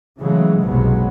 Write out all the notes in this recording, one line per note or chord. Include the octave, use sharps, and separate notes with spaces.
C#3 E3 F#3 G#3 A3
F#1 B1 C3 F#3 G#3 B3